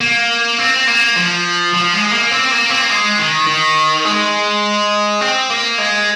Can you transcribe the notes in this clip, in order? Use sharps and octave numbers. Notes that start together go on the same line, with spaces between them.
A#3
C4
A#3
F3
F3
G#3
A#3
C4
A#3
C4
A#3
G#3
D#3
D#3
G#3
C4
A#3
G#3